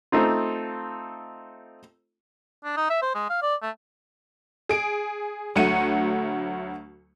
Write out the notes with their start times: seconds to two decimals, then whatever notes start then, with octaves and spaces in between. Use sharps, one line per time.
0.12 A3 C4 D#4 F4
2.64 D4
2.77 D#4
2.90 E5
3.02 C5
3.15 G#3
3.30 F5
3.42 D5
3.62 A3
4.69 G#4 D7
5.56 D2 F#3 A3 F#5 C#7 D#7